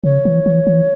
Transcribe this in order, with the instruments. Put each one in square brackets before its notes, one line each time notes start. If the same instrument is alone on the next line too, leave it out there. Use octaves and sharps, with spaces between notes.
[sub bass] C#3 [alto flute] C#5
[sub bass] E3
E3
E3